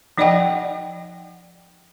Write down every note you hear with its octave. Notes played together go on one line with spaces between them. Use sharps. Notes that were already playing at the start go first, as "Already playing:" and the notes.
F3 D#4 D5 D#5 F#5 G5